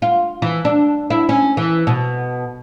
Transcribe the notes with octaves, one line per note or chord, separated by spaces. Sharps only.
F4
E3
D4
E4
C#4
E3
B2